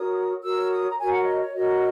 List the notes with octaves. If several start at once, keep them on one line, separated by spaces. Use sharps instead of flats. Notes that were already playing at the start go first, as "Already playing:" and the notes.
Already playing: F#4 A#4 C#5 D#6
F#4 A#4 C#5 E6
D#6
A#5
F#4 A#4 C#5 G#5
F#5
D#5
C#5
F#4 A#4 C#5 D#5